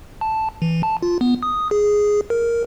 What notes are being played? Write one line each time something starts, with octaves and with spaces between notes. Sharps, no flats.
A5
E3
A5
F4
B3
D#6
G#4
A#4